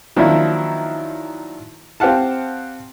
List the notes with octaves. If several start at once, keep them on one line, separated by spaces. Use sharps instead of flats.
D#3 F3 F#3 A#3 D4 E4
C4 G4 F5 F#5 A5